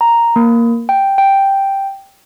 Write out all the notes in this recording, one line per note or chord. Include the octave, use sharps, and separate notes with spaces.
A#5
A#3
G5
G5